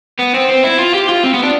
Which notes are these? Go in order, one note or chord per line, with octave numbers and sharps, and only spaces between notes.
B3
C4
C4
E4
F4
G4
F4
C4
B3
D4